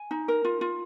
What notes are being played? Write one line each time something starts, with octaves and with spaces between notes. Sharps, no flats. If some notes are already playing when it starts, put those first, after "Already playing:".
Already playing: G#5
D#4
A#4
F4
F4